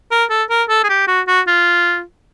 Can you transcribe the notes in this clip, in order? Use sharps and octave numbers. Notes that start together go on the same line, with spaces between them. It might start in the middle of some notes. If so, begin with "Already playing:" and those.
A#4
A4
A#4
A4
G#4
G4
F#4
F#4
F4